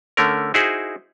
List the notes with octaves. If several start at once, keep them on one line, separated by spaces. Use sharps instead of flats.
D3 A3 C#4 A#4
D#4 E4 F#4 G#4 C5